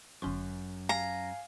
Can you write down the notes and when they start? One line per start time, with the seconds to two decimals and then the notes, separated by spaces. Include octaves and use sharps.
0.22 G1 F#2 C#4 C6
0.89 F5 G#5 A#5